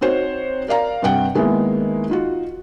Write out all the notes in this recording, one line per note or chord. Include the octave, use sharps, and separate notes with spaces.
C4 D#4 F#4 C5 C#5
A#4 D5 F5 A#5
G2 C3 F#5 G5
D#3 G#3 A#3 B3 D#4 E4
D#4 F4 F#4